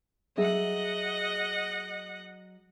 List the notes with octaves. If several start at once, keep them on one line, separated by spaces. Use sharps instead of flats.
F#3 G#4 D#5 E5 F#5